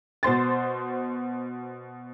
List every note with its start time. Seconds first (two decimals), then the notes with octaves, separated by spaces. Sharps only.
0.23 B2 C5 C6 A6